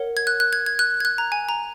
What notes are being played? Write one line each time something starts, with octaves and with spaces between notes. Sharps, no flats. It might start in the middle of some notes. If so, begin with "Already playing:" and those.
Already playing: A#4 C#5 F#5
G#6
F#6
F#6
G#6
G#6
F#6
G#6
F#6
A#5
G#5
A#5